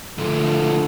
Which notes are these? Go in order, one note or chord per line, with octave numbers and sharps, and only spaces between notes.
D3 F3 A3